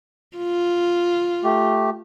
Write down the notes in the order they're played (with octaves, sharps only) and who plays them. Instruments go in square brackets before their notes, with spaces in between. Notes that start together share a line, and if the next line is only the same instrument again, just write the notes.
[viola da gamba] F4
[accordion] A3 G4